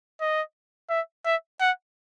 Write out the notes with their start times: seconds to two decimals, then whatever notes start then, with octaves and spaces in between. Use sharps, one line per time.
0.21 D#5
0.90 E5
1.25 E5
1.60 F#5